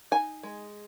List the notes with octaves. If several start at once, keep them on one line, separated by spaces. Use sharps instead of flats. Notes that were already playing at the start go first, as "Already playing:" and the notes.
D#4 G#5
G#3